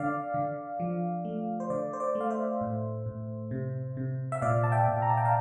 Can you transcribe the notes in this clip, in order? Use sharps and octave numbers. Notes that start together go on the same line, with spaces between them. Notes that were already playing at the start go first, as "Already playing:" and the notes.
Already playing: D3 D5 F5
D3
F3
A3
C5
D3 D5
C5
D5
A3
F5
C5 E5
A2
A2
C3
C3
E5
A#2 D5 F5
A5
E5 G5
A#2
A#5
A5
G5
F5 A5